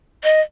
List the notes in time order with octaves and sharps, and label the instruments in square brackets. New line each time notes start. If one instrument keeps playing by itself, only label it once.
[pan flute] D#5